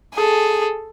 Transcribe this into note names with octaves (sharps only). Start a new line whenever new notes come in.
G#4 A4